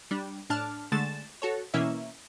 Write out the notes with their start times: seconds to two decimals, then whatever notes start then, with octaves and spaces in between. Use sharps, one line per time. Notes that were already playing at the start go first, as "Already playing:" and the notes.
0.11 G3 D4
0.50 A2 D4 A5 F6
0.92 D3 G#3 A3 A6 E7
1.42 F#4 A4 C#5
1.74 B2 E3 A#3 C#4 E4 E5